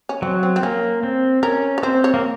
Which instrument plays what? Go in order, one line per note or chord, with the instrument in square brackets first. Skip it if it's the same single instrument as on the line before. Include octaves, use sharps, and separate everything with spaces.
[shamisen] C#4
[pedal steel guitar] F#3 [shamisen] C4
[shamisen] C4
C4
[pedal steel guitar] A#3 [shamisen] C#4
[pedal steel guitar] C4
[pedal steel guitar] C#4 [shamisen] A#4
[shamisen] C#5
[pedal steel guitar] C4 [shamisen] C5
[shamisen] C#5
[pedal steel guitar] A#3